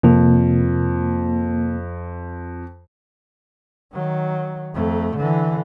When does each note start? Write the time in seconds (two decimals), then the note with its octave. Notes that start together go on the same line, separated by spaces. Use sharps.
0.03 F2 C3 A#3
3.93 D#3 F#3
4.74 F2 A3
5.17 D3 E3